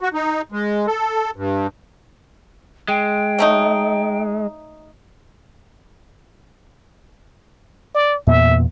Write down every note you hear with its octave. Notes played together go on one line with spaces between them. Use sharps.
F#4
D#4
G#3
A4
G2
G#3 G5
F#3 A3 D#4
D5
E2 A#2 B3 E5